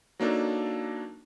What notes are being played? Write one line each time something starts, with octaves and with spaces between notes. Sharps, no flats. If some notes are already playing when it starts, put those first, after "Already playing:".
F#3 A#3 D4 D#4 A4